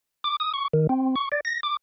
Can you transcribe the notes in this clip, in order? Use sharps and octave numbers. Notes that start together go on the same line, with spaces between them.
D6
D#6
C#6
D#3
C4
C#6
D5
A#6
D6